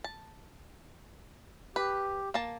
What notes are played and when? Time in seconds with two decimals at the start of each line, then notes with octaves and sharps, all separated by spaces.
0.04 A5
1.76 G4 B4
2.34 A#3 A5